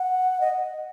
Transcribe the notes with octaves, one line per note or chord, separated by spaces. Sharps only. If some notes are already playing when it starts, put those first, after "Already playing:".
Already playing: F#5
D#5